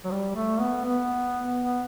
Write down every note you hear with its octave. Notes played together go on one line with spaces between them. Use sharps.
F#3
G3
A3
B3
B3
B3